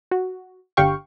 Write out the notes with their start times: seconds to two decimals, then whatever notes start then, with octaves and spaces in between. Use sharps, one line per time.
0.11 F#4
0.77 G1 D3 G4 F5 G5 C#6